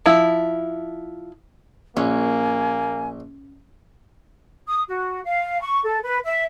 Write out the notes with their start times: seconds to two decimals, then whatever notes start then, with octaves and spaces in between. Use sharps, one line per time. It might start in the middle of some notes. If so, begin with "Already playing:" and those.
0.06 F3 E4
1.97 A#1 A#3 C#4 G#5
4.67 D#6
4.87 F#4
5.24 F5
5.61 C#6
5.85 A4
6.03 B4
6.24 E5